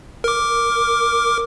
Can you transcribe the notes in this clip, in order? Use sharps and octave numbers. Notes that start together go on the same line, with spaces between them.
A#4 D6